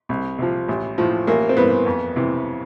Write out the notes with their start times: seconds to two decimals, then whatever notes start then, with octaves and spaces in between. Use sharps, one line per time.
0.09 C2
0.39 C3 F3
0.68 A1
0.98 A2 F3
1.27 A1 A#3
1.49 C4
1.57 G2 E3 B3
1.86 F2
2.16 C3 E3